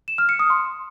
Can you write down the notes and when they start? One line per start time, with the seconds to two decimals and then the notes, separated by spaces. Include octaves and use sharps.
0.08 E7
0.18 F6
0.29 C#7
0.39 D#6
0.50 C6